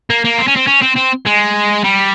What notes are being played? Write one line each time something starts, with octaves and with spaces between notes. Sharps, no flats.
A#3
A#3
C4
C#4
C4
C#4
C4
C4
G#3
G3